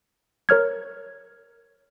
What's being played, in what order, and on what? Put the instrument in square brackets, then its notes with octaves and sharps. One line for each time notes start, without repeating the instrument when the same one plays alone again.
[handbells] A#4 C#5 F6 G#6